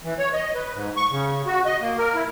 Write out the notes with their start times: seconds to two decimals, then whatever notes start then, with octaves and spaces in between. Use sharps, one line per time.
0.04 E3
0.19 C#5
0.34 D#5
0.55 B4
0.74 G#2
0.96 C#6
1.11 C#3
1.46 F#4
1.65 D#5
1.81 A#3
1.98 A#4
2.15 E4